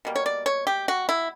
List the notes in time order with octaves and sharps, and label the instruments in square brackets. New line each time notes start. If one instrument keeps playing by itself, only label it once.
[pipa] B2 G3 A#3
C#5
D5
C#5
G4
F#4
E4